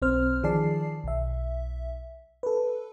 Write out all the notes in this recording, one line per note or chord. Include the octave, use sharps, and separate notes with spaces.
B1 C4 C5 F6
D#3 F3 G#4 D5 A5 C7
B1 E5
A4 B4